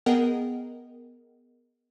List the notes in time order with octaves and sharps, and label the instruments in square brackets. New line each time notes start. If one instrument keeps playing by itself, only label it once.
[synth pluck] B3 G#4 A#4 D#5 F#5 G5